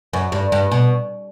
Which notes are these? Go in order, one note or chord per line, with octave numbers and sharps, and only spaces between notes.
F#2
G2
G2
B2